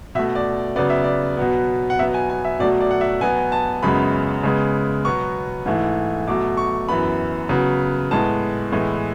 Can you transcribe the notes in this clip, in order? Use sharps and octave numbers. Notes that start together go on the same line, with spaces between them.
B2 A3 E5
D5
C#3 F#3 B3 D5
E5
D5
B2 F#3 B3
F#5
B2 F#3 B3 E5
G#5
G#5
E5
B2 F#3 A3 D5
D5
F#5
E5
B2 F#3 B3 G#5
A5
F#2 C#3 G#3 B3 B5
C#3 G#3 B3
B2 F#3 B3 C#6
G#2 E3 A3
B2 F#3 A3 D6
C#6
F#2 E3 B3 B5
C#3 F#3 B3
A2 G#3 B3 A5
A2 E3 G#3 B3